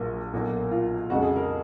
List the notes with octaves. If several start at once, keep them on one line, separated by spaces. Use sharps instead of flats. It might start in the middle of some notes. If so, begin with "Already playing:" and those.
Already playing: A#1 A#2 F#3 A#3
B1 A#2 F#3 A#3
F4
F2 C#3 G#3 F#4
G#4
A#4